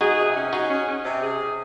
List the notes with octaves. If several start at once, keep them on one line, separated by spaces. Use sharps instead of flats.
D#4 F#4 G#4
C3
C#4
D#4 F#4 G#4
C#4
C#4
C3
G#4
C3